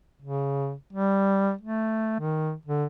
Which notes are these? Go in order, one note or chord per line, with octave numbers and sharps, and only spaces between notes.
C#3
G3
A3
D#3
D3